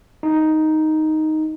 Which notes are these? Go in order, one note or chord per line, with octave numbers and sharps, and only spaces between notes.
D#4